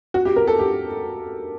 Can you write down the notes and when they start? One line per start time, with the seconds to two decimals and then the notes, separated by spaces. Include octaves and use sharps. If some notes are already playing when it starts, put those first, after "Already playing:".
0.14 F#4
0.25 G4
0.36 A#4
0.47 A4
0.59 G4